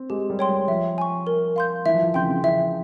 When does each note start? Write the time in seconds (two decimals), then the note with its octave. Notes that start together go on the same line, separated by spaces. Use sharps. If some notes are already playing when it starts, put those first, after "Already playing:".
Already playing: C4
0.10 G#3 G4
0.30 G3
0.39 C#5 G5 C6
0.49 G3
0.68 F3 E5
0.98 G#5 C#6
1.27 A#4
1.56 F5 C6 G6
1.86 E3 E5
1.94 F3
2.04 E3
2.14 C#3 G5 C6 G6
2.22 E3
2.29 C#3
2.44 E3 E5